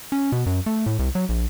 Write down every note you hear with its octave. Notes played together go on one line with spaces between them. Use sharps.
C#4
B2
F#2
A3
A2
C2
F#3
A#1